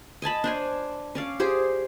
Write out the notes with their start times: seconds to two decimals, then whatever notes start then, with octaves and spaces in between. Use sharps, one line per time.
0.22 D#5 G#5 A5 B5
0.44 D4 C5 G#5
1.15 C#4 D5 F5
1.40 G4 G#4 C5